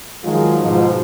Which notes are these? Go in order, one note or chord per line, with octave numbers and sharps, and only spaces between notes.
D#3 F3 F#3 G#3 F4 G#4
G#2 B2 F3